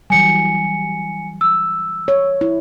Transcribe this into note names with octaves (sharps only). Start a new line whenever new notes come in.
E3 F#3 G3 G#5 C#7
E6
C#5
E4